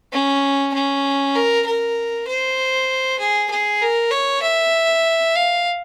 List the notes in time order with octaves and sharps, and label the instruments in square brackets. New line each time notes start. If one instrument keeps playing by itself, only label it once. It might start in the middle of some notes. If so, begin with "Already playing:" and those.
[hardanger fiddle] C#4
C#4
A#4
A#4
C5
G#4
G#4
A#4
C#5
E5
F5